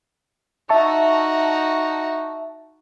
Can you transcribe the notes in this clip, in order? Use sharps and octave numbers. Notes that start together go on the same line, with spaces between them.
D#4 F#4 E5 A5 C#6